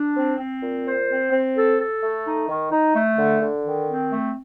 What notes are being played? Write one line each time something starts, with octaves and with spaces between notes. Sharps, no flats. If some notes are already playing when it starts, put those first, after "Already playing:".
Already playing: D4
C4
C4
A#2
C5
C4
C4
A4
A4
A3
D#4
D#3
D#4
A3
D3
D3
D#3
C4
A3